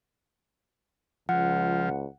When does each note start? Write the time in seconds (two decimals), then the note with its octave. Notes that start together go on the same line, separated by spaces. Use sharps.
1.29 C#2 F3 F#5